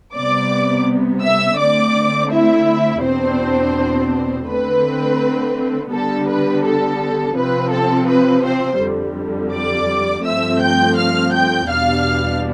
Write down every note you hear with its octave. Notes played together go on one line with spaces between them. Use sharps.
C3 G3 B3 D5 D6
E5 E6
D3 A3 C4 D5 D6
E4 E5
E2 B2 B3 C4 D4 C5
D3 A3 C4 B4
D3 G3 B3 D4 A4
B4
A4
C3 F3 C4 B4
A4
B4
C4 C5
F2 D3 G3
D5 D6
G2 F3 A3 C4 E5 E6
G5 G6
F5 F6
G5 G6
E2 B2 G3 B3 D4 F5 F6